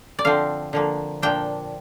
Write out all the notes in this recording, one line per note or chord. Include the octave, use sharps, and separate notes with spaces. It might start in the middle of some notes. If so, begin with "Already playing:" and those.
D5
D3 F3 C4 F5
D3 F3 A#3
A#2 F3 D4 G5